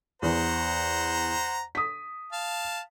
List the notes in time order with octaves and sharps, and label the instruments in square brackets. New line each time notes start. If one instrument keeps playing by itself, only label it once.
[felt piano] E2 [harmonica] C5 F#5 A#5
[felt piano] D#6 B6
[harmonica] F5 A5